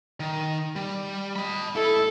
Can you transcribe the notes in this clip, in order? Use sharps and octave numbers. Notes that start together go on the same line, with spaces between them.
D#3
G3
D#5 B5
E4 A4